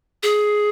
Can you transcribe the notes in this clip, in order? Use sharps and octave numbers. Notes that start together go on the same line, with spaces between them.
G#4